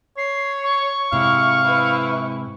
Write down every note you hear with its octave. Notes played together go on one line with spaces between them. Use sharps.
C#5 C7
C#6
G#2 C3 E4 F5
E4 B4